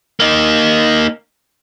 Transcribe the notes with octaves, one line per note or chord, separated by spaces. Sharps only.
A#3 D#4